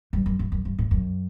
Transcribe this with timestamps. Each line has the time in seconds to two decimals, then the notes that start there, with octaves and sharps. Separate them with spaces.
0.13 G2
0.26 F#2
0.39 G2
0.52 F#2
0.65 G2
0.79 A2
0.91 F#2